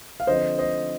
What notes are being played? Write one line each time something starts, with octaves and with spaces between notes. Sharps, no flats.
F5
D3 F3 C4 C5 D#5
C5 D#5